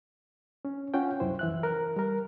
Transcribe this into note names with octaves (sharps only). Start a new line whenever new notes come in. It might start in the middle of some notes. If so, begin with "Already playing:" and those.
C#4
C#4 F4 F#5 G5
C2 F#2 E4 C5
E3 E5 F#6
A#4
G3 A#4